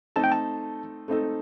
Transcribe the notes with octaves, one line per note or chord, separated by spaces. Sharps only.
A3 C4 D#4 A4 A5
G5
A5
A3 C4 D#4 A4